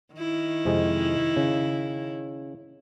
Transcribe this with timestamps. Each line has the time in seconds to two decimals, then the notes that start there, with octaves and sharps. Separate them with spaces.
0.14 D#3 E4
0.65 F2 C3 G#3
1.36 C#3